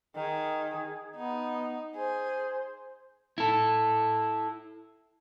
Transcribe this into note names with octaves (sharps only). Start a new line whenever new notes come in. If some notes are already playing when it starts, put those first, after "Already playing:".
D#3 G#4
B3 D#4
G#4 C5
E4 A4